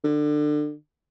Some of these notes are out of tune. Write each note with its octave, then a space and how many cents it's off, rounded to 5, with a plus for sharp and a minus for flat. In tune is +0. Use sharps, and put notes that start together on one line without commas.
D3 +25